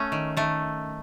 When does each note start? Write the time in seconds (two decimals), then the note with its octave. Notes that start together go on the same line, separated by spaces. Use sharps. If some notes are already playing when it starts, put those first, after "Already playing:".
Already playing: A3 C#4
0.12 D#3
0.37 D#3 A3